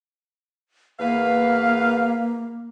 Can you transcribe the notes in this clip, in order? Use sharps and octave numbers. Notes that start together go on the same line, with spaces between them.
E2 A#3 B4 F5